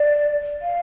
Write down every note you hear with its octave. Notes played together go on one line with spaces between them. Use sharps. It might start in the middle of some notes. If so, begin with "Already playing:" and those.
Already playing: D5
F5